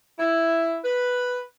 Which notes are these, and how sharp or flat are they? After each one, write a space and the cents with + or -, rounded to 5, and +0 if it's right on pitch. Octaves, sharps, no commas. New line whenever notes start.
E4 +5
B4 +0